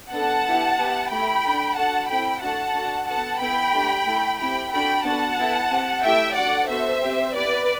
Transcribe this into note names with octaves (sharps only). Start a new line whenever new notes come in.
B3 D4 A4 F#5 A5
B3 E4 G4
B3 E4 G4
A3 E4 G4 G5 B5
D4 A4
D4 F#4 A4 F#5 A5
C4 E4 A4 G5 B5
A3 D4 F#4 A4 F#5 A5
D4 F#4 A4
B3 F#4 A4 F#5 A5
B3 E4 A4 G5 B5
A3 D4 G4
A3 E4 A4
C4 E4 G4 G5 B5
D4 F#4 A4 G5 B5
B3 D4 F#4 A4 F#5 A5
B3 E4 A4
C4 G4
A3 E4 G4 E5 G5
D4 F#4 A4 D5 F#5
B3 F#4 A4 C5 E5
C4 G4
B3 E4 G4 B4 D5